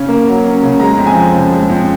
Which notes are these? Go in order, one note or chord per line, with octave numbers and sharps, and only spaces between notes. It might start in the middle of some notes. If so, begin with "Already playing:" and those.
Already playing: C#3 C#4
A#3
F#3
C#4
C#3
G#3 A#5
F2
G#5
F3
C#3
G#3
F2